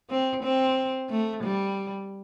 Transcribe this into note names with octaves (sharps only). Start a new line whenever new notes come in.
C4
C4
A3
G3